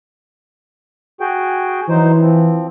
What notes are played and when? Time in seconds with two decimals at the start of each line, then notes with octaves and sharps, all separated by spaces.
1.21 F#4 G#4 G5
1.89 E3 F#3 D#4 C5
2.21 F3 C4